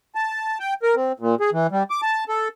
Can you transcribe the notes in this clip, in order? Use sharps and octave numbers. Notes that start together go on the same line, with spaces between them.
A5
G5
A#4
C4
A#2
G#4
E3
G3
D6
A5
A4